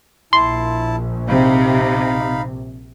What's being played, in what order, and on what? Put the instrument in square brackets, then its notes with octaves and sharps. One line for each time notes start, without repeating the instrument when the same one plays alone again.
[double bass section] A#1 [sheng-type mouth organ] E4 A5 [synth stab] C6
[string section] C3 [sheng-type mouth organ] D#4 F5 B5